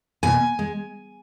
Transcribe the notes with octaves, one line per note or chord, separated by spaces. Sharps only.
B2 G#5
G#3